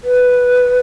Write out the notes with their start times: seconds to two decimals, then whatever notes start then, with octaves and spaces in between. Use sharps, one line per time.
0.04 B4